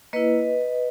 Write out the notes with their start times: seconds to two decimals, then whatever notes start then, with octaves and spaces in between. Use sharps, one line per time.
0.13 A#3 E4 B4 D#5